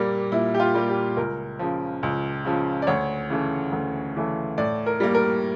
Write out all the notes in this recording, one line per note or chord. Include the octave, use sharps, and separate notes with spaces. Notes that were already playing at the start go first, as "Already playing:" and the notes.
Already playing: A#2 G3 A#3
A#2 E4
G4
F4
G3 A#3
G4
C#2 A#4
C#3 F3
C#2
C#3 F3
D5
D2 C#5
C#3 E3 A3
D2
C#3 E3 A3
A2 D5
A#4
G3 A#3
A#4